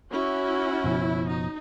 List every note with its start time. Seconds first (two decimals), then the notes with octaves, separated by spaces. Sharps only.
0.12 C#4 E4 F#4
0.84 F#1 B2 F3
1.27 D#4